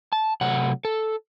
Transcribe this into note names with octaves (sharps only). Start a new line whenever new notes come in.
A5
C3 F#3 A3 F#5
A4